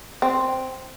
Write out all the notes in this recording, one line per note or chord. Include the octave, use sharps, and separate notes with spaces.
C4